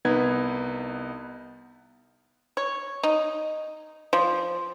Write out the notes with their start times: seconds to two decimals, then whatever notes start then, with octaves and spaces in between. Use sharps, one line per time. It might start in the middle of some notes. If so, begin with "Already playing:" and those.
0.05 C2 B3 D#4 B4 G#6
2.57 C#5
3.03 D#4
4.13 F3